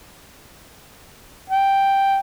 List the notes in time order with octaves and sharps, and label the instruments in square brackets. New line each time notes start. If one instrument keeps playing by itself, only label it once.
[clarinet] G5